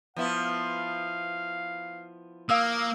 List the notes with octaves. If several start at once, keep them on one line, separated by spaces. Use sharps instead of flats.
F3 B3 E4 F5
A#3 F5 D#6 E6